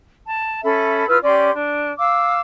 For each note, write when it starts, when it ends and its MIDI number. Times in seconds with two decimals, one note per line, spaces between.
0.25 0.60 81
0.63 1.06 61
0.63 1.06 69
0.63 1.06 76
0.63 1.06 83
1.08 1.18 64
1.08 1.18 65
1.08 1.18 71
1.08 1.18 89
1.24 1.50 61
1.24 1.50 67
1.24 1.50 74
1.24 1.50 84
1.53 1.91 62
1.98 2.40 77
1.98 2.40 86
1.98 2.40 88